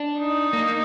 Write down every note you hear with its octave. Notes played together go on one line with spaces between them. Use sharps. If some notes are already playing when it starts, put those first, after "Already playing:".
Already playing: D4
D#4
A#3